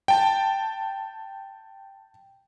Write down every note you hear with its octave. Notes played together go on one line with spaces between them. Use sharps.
G5 A5